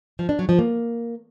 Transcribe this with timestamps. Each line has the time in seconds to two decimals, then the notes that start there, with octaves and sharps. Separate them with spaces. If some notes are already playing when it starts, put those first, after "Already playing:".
0.19 F3
0.29 D4
0.39 F#3
0.49 F3
0.59 A#3